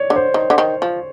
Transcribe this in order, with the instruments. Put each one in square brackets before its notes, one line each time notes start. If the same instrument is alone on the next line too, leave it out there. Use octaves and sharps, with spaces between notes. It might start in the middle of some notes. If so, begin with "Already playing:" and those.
Already playing: [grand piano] C#5 D5
[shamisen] D3
[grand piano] C5
[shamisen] D#3
D3
D#3
F3